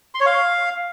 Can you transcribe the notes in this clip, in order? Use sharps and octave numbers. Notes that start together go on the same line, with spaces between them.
C6
C#5
F5